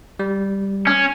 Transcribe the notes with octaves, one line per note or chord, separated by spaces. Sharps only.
G3
C#4